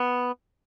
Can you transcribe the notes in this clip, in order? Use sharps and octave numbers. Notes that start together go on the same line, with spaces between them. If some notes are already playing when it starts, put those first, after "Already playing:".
Already playing: B3